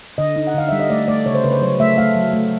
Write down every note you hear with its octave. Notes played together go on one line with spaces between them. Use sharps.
D3 D#5
D#4
F#5
D3 F5
G3 E5
D#5
A3 D5
A3 D5
C#3 C#5
C5
C#3 B4
C5
F#3 C#5
A3 E5
A3 F5
F#3
A3